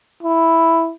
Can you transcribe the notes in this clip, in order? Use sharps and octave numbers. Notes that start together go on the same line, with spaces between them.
E4